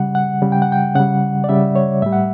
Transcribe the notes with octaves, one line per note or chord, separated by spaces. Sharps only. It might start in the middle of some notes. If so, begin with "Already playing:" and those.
Already playing: C#3 G3 F#5
F#5
C#3 G3
G5
F#5
G5
C#3 G3 F#5
D5
C#3 G3 E5
C#5
A2 G3 E5
F#5